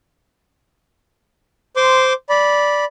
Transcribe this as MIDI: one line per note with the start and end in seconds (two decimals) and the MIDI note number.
1.76 2.13 72
1.76 2.13 84
1.76 2.13 86
2.29 2.85 74
2.29 2.85 83